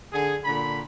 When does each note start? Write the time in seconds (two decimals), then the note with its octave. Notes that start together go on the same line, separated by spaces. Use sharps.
0.13 D3 G#4
0.45 A#2 D3 B5